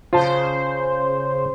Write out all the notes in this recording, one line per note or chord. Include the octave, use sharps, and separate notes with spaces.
C#3 F4 C5 A5